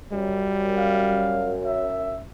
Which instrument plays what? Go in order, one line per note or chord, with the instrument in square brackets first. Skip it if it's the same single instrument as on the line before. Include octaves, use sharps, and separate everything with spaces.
[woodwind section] F#2 [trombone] G3
[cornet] F5
E5